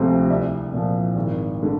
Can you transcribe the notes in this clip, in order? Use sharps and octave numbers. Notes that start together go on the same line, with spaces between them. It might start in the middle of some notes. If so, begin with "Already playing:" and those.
Already playing: D2 C3 F3 A3 C4
C2 D5 E5
A#2 F3
G#1
D3